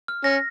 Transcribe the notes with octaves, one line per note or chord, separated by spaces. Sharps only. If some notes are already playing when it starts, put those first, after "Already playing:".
F6
C#4 A#6